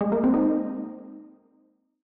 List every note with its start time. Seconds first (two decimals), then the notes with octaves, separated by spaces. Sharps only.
0.01 G#3
0.12 A#3
0.24 C4
0.34 D#4